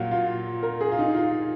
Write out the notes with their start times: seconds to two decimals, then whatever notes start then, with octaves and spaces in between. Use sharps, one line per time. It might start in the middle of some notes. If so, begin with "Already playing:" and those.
Already playing: A#2 F#3 A#3 F4 F#4
0.11 F4
0.63 A#4
0.81 G#4
0.92 F4
0.98 D#4
1.15 F4